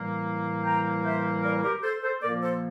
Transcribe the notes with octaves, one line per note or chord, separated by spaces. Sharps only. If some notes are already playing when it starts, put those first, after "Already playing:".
Already playing: A2 E3 G3 A#3
G5 A#5
C5 E5
A#4 D5
G4 A#4
A4 C5
A4 C5
A#2 F3 A#3 A#4 D5
A4 C5